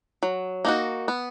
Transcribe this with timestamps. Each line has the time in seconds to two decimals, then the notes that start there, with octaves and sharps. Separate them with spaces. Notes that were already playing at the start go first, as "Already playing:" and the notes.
0.23 F#3
0.65 A#3 D#4 F#4
1.08 B3